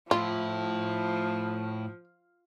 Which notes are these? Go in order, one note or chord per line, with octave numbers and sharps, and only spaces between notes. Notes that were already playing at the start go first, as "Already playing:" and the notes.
A2 F3 E4 F4